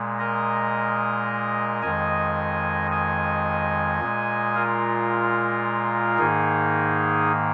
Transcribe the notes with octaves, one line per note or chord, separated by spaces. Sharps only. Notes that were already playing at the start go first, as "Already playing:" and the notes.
Already playing: A#2 G#3
A#4 D#5
F2 D#3 G#3 D#5 G#5
D#5 G#5
A#2 G#3
F4 A#4
G#2 D#3 A#3 D#4 G#4